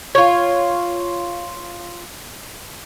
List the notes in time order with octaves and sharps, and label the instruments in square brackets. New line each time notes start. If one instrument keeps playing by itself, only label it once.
[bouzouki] F4 C#5